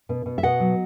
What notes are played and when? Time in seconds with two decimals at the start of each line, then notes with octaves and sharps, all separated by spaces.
0.09 B2
0.26 B2
0.38 E5
0.43 B2 D#5 F#5
0.60 F#3